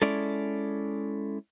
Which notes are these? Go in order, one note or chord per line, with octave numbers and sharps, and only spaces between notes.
G#3 C#4 E4 A4 D5